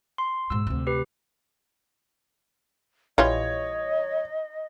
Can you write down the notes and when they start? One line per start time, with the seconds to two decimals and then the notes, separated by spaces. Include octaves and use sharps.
0.18 C6
0.50 G#2 B2 E6
0.67 D2 C3
0.87 G4 B4
3.18 A#1 E3 G3 F4 C#5 D#5